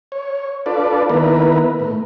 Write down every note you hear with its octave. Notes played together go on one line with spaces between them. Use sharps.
C#5
D4 F4 A4 B4 D5
D#3 B3 E4 A#4 B4
A2